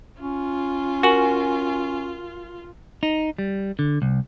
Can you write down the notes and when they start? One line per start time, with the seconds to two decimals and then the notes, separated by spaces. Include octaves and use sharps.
0.21 C#4 F4
1.03 F#4 A#4 G#5 F#7
3.03 D#4
3.38 G3
3.79 D3
4.02 C2